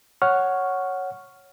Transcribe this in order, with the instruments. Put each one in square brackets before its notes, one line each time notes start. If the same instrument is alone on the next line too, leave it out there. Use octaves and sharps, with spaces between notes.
[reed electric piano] C#5 F#5 C#6 F6